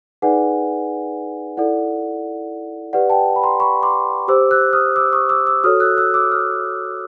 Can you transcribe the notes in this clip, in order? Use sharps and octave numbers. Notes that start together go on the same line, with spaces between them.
D#4 G#4 B4 D5 F#5 G#5
E4 A4 D5 F#5
G4 B4 D5 F#5
G5 A5
B5
A#5 C6
B5 C#6
C6 D6
G4 C5 D6 E6
E6 F#6
D#6 F6
D6 E6
C#6 D#6
D6 E6
D6 E6
F#4 A4 C#5 D#6 F6
E6 F#6
E6 F#6
D6 E6
D#6 F6